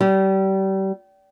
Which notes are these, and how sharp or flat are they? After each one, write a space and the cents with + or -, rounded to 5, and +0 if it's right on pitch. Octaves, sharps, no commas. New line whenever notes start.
G3 -30